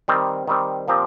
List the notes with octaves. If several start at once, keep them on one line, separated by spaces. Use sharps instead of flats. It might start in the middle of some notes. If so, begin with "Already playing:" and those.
D#3 G3 C4
D#3 G3 C4
A#2 F3 C4 G4 A#4